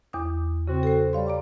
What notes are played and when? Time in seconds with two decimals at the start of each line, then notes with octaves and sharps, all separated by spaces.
0.13 E2 D6 D#6
0.68 C#3 C4 F#4
0.83 A4 C5
1.13 G3 C#5 F5 C6
1.27 D5 A#5 D6